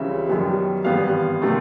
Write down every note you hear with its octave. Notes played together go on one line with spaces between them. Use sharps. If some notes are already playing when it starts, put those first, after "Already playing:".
Already playing: C#2 C#3 E3 G3 C4 E5
F#2 D#3 G3 B3
G#1 G2 E3 G3 B3 F5
C3 D#3 F#3 A3